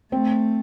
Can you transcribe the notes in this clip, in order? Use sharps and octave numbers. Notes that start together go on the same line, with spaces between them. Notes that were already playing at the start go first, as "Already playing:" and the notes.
A3 C4